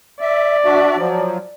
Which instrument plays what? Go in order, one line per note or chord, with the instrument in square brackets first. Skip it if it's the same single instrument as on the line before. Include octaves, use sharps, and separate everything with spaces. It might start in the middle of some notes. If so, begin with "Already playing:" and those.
[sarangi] D5 [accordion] E5
[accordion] D4 F#4 E5
F3 F#3